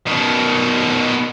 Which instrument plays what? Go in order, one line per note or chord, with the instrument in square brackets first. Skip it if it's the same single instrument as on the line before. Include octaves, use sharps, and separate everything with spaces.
[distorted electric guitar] B2 D#3